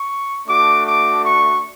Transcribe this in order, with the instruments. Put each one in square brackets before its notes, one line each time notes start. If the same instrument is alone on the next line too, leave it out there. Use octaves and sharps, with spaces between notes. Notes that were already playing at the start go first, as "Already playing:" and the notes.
Already playing: [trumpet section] C#6
A3 D4 F#4 D6
D6
C#6